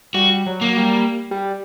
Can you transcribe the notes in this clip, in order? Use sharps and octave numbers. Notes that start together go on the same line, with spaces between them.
G3 F#4
F#3
A#3
G3
G3